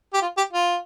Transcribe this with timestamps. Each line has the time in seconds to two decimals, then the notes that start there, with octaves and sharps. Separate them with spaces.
0.14 G4
0.22 F4
0.37 G4
0.53 F4